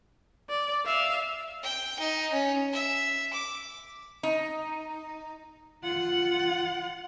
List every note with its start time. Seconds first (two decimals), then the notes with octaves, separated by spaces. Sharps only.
0.49 D5
0.86 E5 F5
1.62 G5
1.99 D#4
2.32 C#4
2.73 E5
3.33 D6
4.23 D#4
5.84 F4 F#5